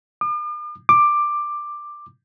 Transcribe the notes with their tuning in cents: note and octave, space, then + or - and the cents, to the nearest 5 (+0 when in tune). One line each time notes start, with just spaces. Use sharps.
D6 +45
D6 +10